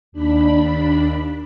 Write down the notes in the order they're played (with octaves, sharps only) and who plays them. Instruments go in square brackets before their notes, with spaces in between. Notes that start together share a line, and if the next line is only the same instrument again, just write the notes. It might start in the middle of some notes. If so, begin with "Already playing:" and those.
[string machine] D#2 D4 B5